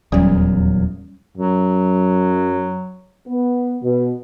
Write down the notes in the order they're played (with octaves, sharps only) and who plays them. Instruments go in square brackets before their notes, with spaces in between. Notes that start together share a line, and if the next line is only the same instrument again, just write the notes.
[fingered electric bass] D#1 E2 [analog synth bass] F#3 [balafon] G3 C#4
[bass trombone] F#2 [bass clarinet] F#3
[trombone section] B3
B2